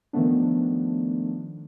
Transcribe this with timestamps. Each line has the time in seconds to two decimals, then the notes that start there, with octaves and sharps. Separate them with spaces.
0.13 D#3 F3 A3 B3 D4